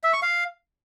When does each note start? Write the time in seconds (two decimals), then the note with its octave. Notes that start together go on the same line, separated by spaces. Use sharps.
0.04 E5
0.13 C#6
0.22 F5